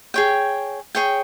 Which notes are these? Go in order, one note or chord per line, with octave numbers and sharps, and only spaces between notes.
G#4 C#5 G5
G#4 C#5 G5